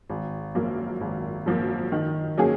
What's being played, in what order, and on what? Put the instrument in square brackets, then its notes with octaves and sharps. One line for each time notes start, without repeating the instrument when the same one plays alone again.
[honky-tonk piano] G#1
F#2 F3 A#3
G#1
F#2 F3 A#3
D#3
F#3 A#3 C#4 G#4